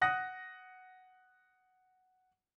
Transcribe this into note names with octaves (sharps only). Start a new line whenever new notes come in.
F#5 D#6 F#6 A#6